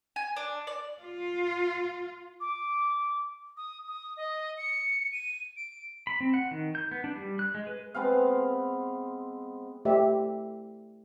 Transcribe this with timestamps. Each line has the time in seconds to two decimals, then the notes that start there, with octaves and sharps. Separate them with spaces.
0.16 G#5
0.36 D4
0.67 D5
1.02 F4
2.41 D6
3.57 D#6
3.88 D#6
4.17 D#5
4.57 C#7
5.12 D#7
5.56 D7
6.07 B5
6.20 C4
6.34 F#5
6.51 D#3
6.75 G6
6.91 B3
7.04 D4
7.16 G3
7.39 F#6
7.55 G#3
7.67 B4
7.95 G#3 B3 C4 F5
9.85 A3 G4 C5 D5 E5